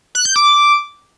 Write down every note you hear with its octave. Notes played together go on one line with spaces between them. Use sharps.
F#6
G6
D6